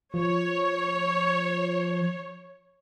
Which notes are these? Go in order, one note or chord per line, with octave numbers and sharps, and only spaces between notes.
F3 C#5